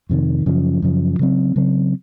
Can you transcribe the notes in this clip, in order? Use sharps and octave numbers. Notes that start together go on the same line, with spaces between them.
F2 C3 D#3
F#2 C#3 F3
F#2 C#3 F3
C#3 F#3 C4
C#3 F#3 C4